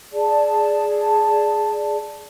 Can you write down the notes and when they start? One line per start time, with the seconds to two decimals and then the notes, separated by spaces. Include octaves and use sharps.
0.13 G#4 D5 A5